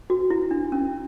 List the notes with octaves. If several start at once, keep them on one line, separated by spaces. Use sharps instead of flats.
F#4
E4
D4
C#4